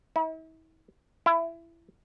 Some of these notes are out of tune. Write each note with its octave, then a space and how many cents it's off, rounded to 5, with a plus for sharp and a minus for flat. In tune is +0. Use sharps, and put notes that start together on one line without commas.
E4 -45
E4 +20